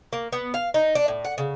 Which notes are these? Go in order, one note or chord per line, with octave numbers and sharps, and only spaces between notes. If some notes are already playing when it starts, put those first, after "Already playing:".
A#3
B3
F5
D#4
D4
A2
F#5
C#3